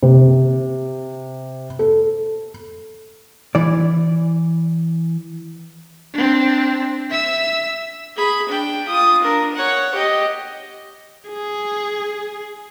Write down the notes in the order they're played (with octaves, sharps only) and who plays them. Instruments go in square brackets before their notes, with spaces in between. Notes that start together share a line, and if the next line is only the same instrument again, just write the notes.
[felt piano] C3
A4
[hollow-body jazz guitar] E3 D5
[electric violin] C4 D4
E5 E6
[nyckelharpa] G#4 B5
D4 G5
F4 D#6
D4 A#4
C#5 F#5
G4 D#5
[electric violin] G#4